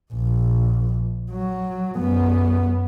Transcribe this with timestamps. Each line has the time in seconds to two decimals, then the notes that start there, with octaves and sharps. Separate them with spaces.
0.14 A#1
1.31 F#3
1.98 F#2 B3